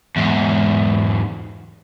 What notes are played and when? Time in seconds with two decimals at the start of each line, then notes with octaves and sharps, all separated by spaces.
0.16 E2 G#2